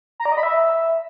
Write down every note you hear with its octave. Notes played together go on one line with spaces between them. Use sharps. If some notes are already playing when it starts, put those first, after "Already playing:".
A#5
D5
D#5
B5
E5